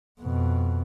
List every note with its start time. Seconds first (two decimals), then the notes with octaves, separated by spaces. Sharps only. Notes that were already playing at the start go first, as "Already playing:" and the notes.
0.20 F2 B2